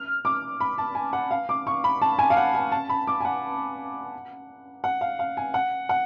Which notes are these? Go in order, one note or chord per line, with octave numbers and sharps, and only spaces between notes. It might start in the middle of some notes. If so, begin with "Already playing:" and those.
Already playing: F6
D6
B5
A5
G#5
F#5
F5
D6
C#6
B5
A5
G#5
F5
F#5
G#5
A5
B5
D6
G#5
F#5
F#5
F5
F5
G#5
F#5
F#5